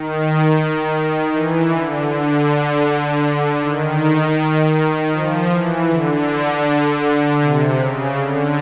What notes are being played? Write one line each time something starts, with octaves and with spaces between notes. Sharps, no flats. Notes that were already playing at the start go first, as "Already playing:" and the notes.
Already playing: D#3
E3
D3
D3
D#3
F3
E3
D3
C3
C#3
D3